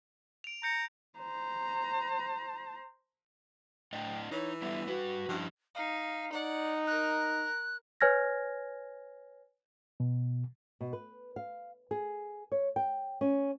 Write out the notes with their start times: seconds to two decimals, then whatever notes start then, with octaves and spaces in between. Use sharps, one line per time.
0.44 D7 F7
0.63 A#5 G6 C#7
1.18 C5 A#5
3.93 A2 D4 D#5 G5
4.31 E3 D#4 C#5
4.62 G3 B3 D4 E5
4.87 G3 F#4 B4
5.29 G2 F3 E4 G5
5.75 D#4 F5
6.32 D#4 D5 F#5
6.87 A#4 A#5 F#6
8.01 B4 C#5 G#5 F6 G#6 A#6
10.00 B2
10.81 B2
10.93 B4
11.36 F5
11.91 G#4
12.52 C#5
12.76 G5
13.21 C#4